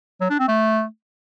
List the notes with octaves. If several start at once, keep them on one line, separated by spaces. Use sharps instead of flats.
F#3
D4
C4
A3